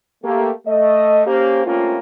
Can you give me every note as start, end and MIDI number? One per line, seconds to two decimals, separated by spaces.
0.24 0.50 57
0.24 0.50 58
0.24 0.50 67
0.67 1.22 57
0.67 1.22 75
1.27 1.63 58
1.27 1.63 61
1.27 1.63 67
1.27 1.63 72
1.66 1.99 55
1.66 1.99 57
1.66 1.99 58
1.66 1.99 60
1.66 1.99 61
1.66 1.99 65